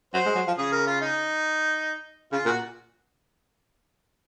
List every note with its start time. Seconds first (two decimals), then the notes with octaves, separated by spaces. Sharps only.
0.14 F#3 C5
0.26 G#3
0.36 F#3
0.47 F3
0.58 C#3 G#4
0.72 A#4
0.87 F4
1.01 D#4
2.32 C#3 F4
2.46 A#2 F#4